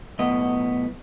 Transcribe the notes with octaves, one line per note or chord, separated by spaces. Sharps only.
B1 A2 B3 D#5